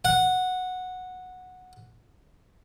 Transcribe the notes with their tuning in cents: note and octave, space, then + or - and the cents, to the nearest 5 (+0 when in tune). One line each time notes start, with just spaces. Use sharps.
F#5 -10